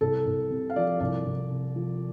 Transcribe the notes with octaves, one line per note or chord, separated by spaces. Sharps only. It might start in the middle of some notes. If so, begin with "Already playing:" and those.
C2 A4
C2
C3
F5
F3 D5
C2 D5
C2
C3
F3